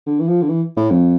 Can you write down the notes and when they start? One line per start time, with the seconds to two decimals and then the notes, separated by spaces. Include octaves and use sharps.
0.07 D3
0.20 E3
0.28 F3
0.42 D3
0.49 E3
0.77 A2
0.91 F2